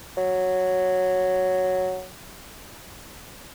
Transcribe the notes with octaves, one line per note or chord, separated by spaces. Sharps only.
F#3